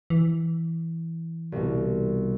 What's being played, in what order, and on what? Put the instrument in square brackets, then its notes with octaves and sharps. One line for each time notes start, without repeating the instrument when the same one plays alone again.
[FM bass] E3
[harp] C2 B2